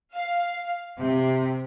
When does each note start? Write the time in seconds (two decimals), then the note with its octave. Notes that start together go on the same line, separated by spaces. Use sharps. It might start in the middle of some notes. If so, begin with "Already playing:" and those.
0.14 F5
0.99 C3